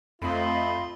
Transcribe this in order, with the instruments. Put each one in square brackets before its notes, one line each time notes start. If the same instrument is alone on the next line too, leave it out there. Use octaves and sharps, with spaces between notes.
[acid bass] F2 [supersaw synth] A3 C4 D#5 [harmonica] F4 [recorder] B5